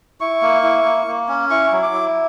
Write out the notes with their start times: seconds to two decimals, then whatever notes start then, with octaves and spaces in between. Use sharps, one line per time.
0.21 E4 C#6
0.42 A#3
0.63 E4
0.85 A#3
1.07 A#3
1.28 C#4
1.50 E4 C#6
1.72 F#3
1.83 D6
1.94 E4